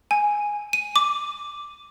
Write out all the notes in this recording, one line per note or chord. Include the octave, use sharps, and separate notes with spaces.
G#5
D#7
D6